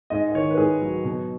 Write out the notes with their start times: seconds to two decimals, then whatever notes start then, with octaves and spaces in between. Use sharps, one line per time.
0.10 G#2 D#5
0.29 D#5
0.35 D#3 C#5
0.51 B4
0.58 G#2 G#4
0.82 F#3
1.05 B2